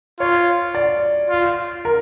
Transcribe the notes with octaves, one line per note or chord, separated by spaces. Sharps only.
F4 C#5
D5
F4
A#4